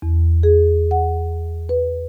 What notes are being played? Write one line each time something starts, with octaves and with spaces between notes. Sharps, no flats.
E2
G#4
F#5
B4